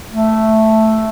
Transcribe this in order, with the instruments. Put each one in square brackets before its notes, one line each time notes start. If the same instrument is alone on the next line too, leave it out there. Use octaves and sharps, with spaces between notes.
[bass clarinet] A3